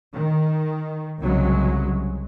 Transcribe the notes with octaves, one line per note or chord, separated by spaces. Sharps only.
D#3
C2 C#3 F#3 G#3